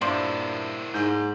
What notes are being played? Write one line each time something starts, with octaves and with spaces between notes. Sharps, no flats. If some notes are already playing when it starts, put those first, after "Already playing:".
G2 A#2 A#3 E4 F4 C5 D5
G#2 G6